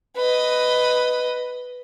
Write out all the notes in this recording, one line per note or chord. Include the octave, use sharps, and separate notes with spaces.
B4 D#5